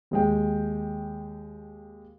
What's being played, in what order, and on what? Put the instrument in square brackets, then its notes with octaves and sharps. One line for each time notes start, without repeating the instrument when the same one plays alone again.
[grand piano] D#2 G#3 G5